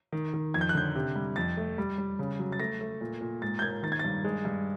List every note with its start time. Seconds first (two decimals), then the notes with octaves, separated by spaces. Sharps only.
0.12 D#3
0.34 D#3
0.54 F2 G#6
0.61 G6
0.69 F#6
0.75 D3 G6
0.95 C3
1.15 G3
1.36 F2 A6
1.57 A3
1.78 G3
1.98 G3
2.19 C#3
2.39 F#3
2.52 A6
2.60 A3 A#6
2.81 A3
3.01 A#2
3.21 A#2
3.42 G#2 A6
3.59 G6
3.62 A#3 G#6
3.83 D#3 A6
3.92 G#6
3.99 G2 A6
4.24 G#3
4.45 G2